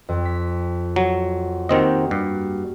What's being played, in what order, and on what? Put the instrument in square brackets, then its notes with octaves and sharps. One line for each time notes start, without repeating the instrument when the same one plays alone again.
[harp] F2
B6
[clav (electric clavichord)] F#3
[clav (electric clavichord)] D#3 C4 D#5 [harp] A#3 F#4 G4
[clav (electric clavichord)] G2